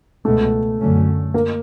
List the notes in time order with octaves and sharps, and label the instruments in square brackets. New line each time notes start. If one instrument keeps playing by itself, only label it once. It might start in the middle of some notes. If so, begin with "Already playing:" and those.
[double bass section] C#2 B2 G#3 B3 [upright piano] A3
[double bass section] F#2 D3 F#3 A3 C#4
[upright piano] A#3